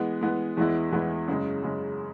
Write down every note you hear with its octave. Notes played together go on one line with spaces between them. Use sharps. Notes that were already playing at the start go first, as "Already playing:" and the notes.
Already playing: E3 G#3 B3
E3 G#3 B3
E2 E3 G#3 B3 E4
E2 E3 G#3 B3 E4
F#2 C#3 G#3
F#2 C#3 G#3